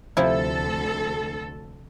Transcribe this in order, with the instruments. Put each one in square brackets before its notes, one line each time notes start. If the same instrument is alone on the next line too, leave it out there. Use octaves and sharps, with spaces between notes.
[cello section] D2 A4 [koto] C3 F3 E4